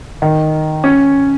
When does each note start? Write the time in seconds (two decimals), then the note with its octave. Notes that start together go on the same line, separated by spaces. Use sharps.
0.22 D#3
0.84 C#4